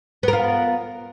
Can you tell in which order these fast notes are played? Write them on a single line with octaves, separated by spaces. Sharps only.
B3 A#4 F4